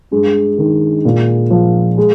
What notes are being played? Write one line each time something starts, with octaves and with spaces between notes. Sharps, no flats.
G2 G#3
D#3
A#2
F3
G#3